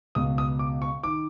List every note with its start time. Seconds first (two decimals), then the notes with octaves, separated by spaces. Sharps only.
0.15 C#2 B2 D#6
0.38 D#6
0.59 D6
0.82 C#6
1.03 D#3 D6